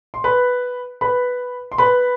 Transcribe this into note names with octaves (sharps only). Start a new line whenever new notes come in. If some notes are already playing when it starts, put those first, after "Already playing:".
C6
B4 B5
B4 B5
C6
B4 B5